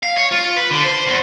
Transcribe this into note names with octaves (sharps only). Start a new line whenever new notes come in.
F5
C#5
F4
B4
D3
C5
E2